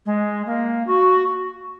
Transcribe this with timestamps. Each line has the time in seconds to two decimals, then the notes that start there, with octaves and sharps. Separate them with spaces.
0.06 G#3
0.46 A#3
0.87 F#4